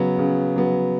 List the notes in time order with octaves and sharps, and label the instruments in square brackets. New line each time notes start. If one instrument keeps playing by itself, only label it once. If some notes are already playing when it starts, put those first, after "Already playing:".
Already playing: [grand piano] C#3 F#3 B3
C#3
F#3 B3